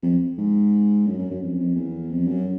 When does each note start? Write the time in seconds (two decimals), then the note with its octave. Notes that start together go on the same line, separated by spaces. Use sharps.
0.03 F2
0.38 G#2
1.07 F#2
1.19 F#2
1.30 F#2
1.42 F2
1.59 F2
1.75 E2
2.11 F2
2.27 F#2